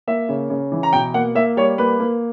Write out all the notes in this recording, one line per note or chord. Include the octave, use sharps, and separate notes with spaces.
A#3 E5
C#3
C#3
E3
A#5
B2 G5
A#3 F#5
A#3 E5
G3 C#5
A#3 B4
A#3